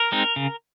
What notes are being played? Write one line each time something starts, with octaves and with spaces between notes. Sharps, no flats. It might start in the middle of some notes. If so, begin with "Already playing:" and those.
Already playing: A#4
G#3 C4 D#4
C#3